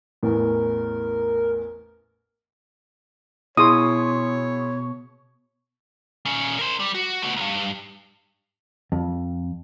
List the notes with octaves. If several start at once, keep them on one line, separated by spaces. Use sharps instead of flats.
A1 E2 A2 A#4
B2 E4 G#4 C#5 C6 D#6
A#2 C#4
A#4 C5
G3
F#4
A3 B3
B1 G2
F2